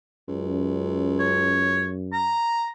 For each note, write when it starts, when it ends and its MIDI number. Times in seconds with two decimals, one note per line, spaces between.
0.28 1.92 37
0.28 2.37 42
1.20 1.89 73
2.13 2.69 82